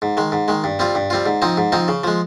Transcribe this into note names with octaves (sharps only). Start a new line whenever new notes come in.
G#2
D#3 G#3
G#2
D#3 G#3
G2
G3 C4 F4
G2
G3 C4 F4
G#2
F3 C4 D#4
G#2
F3 C4 D#4
C#3
F3 G#3